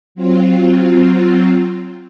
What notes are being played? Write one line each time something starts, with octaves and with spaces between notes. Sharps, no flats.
F#3 C4 F4